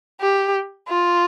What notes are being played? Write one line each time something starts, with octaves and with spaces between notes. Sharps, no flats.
G4
F4